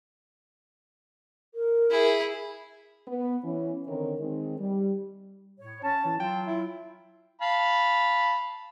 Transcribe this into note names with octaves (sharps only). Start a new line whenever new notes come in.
A#4
E4 G#4
B3
E3 C#4
D3 D#3 C4 A#4 C#5
D#3 G#3 C4 D#4
G3
A2 C#5
C#4 A5
E3
F#3 F4 G5
E4
F5 A5 B5